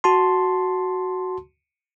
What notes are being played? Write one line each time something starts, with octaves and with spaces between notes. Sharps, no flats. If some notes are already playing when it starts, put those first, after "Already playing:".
F#4 A5 C6